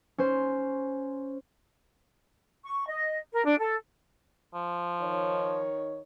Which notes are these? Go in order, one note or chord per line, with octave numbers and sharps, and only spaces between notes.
C#4 C5
C#6
D#5
A#4
D4
A4
F3
D#3 D#4 C#5